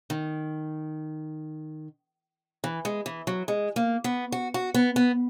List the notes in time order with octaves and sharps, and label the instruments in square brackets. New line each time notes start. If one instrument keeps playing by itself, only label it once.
[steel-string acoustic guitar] D#3
E3
G#3
E3
F#3
G#3
A#3
B3
F#4
F#4
B3
B3